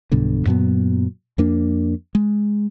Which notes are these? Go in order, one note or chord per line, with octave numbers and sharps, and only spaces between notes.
B1 G2 B2 D3
F#2 A#2 F#3 B3
F2 A#3 D4
G#3